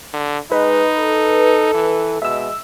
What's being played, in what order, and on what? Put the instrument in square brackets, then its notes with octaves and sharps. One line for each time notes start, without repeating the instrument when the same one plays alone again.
[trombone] D3
[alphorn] G#3 [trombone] D#4 [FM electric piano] B4
[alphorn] A4
[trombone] E3
[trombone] B2 [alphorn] G#3 [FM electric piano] E5 E6